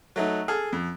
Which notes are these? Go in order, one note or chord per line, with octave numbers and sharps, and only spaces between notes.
F#3 A3 D#4
G#4 A4 F6
F2